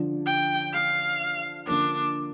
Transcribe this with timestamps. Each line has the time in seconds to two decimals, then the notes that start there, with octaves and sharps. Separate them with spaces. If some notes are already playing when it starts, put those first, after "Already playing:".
Already playing: D3 F3 D4
0.26 G5
0.73 F5
1.66 D3 F3 A#3 D4